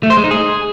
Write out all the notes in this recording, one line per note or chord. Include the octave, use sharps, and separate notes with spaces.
A3
C5
G#3
D#4
G#4